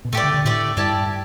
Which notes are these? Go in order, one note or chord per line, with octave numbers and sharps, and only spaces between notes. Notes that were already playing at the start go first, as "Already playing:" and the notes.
B2
A2 A3 G4 D5
D3
D3
A2 A3 G4 D5
G2 E4 G4 D5 A5